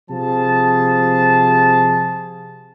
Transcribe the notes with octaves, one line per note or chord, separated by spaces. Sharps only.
C3 F3 G#4 A5